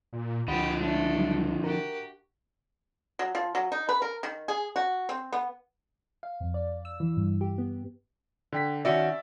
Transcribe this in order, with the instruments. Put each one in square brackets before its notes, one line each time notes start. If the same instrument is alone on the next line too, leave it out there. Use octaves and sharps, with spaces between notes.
[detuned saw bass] A#2
[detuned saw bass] C#2 [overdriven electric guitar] D3 F3 [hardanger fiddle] G4 [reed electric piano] D#5 F#5 B5
[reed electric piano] G#3 C#4 [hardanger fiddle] A3 D4
[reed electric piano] F#3 G3 D#4
[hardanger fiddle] F#4 G4 [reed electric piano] A#4
[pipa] F#3
F3
F#3
D#4
B4
A#4
D#3
G#4
F#4
C4
B3
[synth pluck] F5
F2
D5
E6
E3
G2
G4
B3
[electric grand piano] D3 G5 B6
[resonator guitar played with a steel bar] D#3 C#4 F#4 [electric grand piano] D5 E5 E6